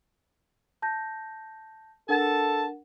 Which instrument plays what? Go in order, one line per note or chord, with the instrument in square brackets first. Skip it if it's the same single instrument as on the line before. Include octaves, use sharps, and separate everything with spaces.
[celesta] A5 G6 A#6
[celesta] D4 A#4 F#5 [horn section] A4 A5